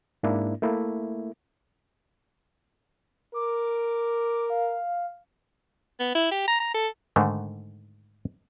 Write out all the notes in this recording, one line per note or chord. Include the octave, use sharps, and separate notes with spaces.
G#2 A#3 D4 E4
A3 A#3 E4
A#4 D6
F5
B3
E4
G4
A#5
A#5
A4
G#2 D3 D#3 A3